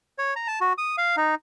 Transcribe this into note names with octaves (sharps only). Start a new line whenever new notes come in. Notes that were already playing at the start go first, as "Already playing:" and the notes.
C#5
A#5
A5
F#4
D#6
F5
D#4